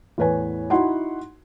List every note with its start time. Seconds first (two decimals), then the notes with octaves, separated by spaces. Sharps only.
0.18 E2 A2 B4 C#5 G#5
0.70 D#4 E4 F#4 F#5 C6